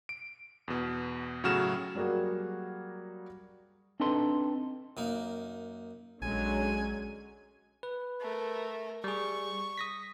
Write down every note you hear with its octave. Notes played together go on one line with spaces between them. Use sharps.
D7
E2 B2
A2 C#3 F#3 F#4 F6 E7
F#3 G3 A#3 F#4 G#4
C4 D4 D#4 A4 B4 C6
F#2 A#3 D#4
A#1 D3 F#3 G#3 C#4 G#5
B4
A3 A#4
G3 G#4 C#6
D#6 A#6 B6